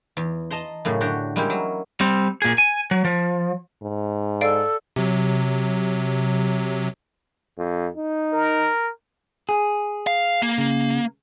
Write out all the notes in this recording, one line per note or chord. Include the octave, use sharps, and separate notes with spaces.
E2
D#5 A5 A#5 C6
F#2 A2 C#3
D3 F#4 G4
G3 G#3 A#3 C#4 E4 G4
F#3
G3 C4
A#2 G#4
G#5
F#3
F3
G#2
A4 D5 F5 D7
C3 F#3
F2
D#4
A#4
G#4
F5
A#3
C#3